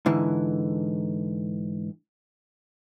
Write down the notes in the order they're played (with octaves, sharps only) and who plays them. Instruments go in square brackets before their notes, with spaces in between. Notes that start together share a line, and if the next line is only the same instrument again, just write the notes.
[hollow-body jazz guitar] G#2 D3 E3